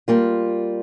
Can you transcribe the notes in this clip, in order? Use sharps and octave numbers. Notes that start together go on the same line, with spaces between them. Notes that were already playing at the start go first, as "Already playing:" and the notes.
G3 A#3 F4